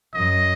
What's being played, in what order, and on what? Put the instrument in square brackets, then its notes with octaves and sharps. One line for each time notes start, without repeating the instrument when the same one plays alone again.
[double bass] F#2 [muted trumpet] D#5